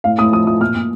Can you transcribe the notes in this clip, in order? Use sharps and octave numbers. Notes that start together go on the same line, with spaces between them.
A2 F5
A2 D#6
F3 D#6
F3 D#6
A#2 F6
A#2